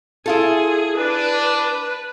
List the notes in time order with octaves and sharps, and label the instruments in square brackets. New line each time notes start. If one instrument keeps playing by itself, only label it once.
[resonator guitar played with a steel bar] E4 F4 A4 [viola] G#4
[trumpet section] D4 [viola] B4